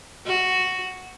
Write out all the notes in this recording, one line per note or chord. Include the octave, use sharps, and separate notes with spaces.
F#4